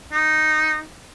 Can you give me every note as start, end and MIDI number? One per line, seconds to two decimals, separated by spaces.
0.12 0.81 63